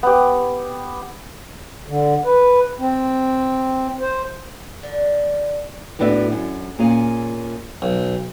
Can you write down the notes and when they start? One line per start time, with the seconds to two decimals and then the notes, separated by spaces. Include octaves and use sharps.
0.03 B3 G4
1.87 D3
2.25 B4
2.79 C4
4.01 C5
4.83 D3
5.99 A2 A3 B3 D4 F#4 E5
6.32 F#2
6.79 A#2 C#4 G#4 F5
7.82 B1